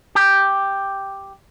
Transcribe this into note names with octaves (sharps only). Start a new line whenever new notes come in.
G4